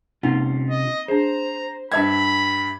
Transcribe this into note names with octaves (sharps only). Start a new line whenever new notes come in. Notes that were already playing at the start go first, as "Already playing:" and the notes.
C3 A#3 C4 C#4 D#4 F4
D#5
D4 G#4 C5 A#5
G2 E5 B5 G#6